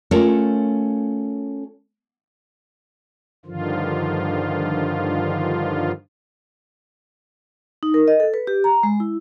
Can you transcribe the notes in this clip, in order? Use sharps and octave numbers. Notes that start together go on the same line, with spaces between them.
A3 C#4 F4 A4 A#4 C#5
G2 D3 D#3 F3 F4
D#4
A#4
D#5
A4
B4
G4
A#5
G#3
E4